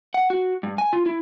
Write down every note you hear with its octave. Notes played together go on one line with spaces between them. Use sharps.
F#5
F#4
G2
G#5
F4
E4